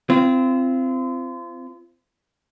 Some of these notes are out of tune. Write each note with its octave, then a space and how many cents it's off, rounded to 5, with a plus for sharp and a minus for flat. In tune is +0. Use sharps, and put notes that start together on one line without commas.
C4 -15 F4 -35